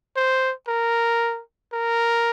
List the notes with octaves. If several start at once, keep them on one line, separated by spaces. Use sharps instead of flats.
C5
A#4
A#4